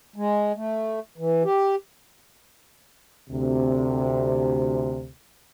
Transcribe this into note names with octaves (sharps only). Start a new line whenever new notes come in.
G#3
A3
E3
G4
D2 C3